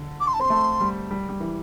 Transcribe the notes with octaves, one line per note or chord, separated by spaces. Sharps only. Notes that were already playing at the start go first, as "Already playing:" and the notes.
Already playing: D3
D6
C6
A5
C4 C6
A3
G3
G3
G3
E3